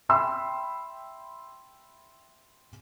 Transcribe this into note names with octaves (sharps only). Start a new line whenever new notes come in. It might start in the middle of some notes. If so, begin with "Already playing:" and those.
E5 G5 B5 C6 E6